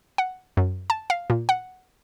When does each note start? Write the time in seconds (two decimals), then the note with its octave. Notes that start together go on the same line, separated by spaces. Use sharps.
0.18 F#5
0.57 F#2
0.90 A5
1.10 F5
1.30 A#2
1.49 F#5